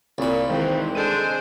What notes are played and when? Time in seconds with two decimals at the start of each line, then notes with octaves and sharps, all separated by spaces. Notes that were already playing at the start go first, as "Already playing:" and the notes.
0.18 C2 A#2 B5
0.50 D#3 E3 G#3 C4
0.95 G#3 D4 A4 C5 D#7